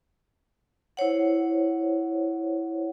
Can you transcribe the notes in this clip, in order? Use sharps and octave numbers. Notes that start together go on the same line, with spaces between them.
E4 C5 C#5 F#5